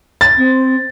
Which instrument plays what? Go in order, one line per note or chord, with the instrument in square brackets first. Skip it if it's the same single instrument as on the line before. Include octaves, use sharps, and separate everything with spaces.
[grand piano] A6
[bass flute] C4